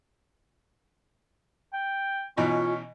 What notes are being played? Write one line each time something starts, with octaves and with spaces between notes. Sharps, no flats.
G5
B2 E3 C#4 D#4 F4